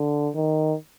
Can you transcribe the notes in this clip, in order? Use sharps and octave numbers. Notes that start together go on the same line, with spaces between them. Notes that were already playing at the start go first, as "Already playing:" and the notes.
Already playing: D3
D#3